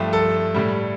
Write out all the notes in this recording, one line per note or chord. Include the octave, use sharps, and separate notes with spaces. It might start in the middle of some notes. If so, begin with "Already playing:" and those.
Already playing: G2 F3 A3 G4
A4
A2 G3